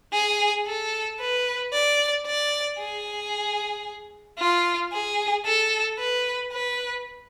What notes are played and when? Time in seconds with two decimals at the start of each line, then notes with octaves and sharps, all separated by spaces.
0.13 G#4
0.67 A4
1.20 B4
1.73 D5
2.26 D5
2.79 G#4
4.39 F4
4.93 G#4
5.45 A4
5.98 B4
6.52 B4